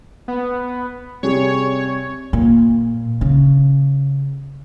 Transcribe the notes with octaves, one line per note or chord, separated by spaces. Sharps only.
B3
C3 G3 G#4 C#5
A#2
C#3